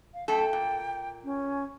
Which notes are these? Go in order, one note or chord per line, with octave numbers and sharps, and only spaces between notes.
F5
F#2 A3 A4 G5
A#2
C#4